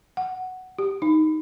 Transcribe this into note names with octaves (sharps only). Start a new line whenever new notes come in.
F#5
G4
D#4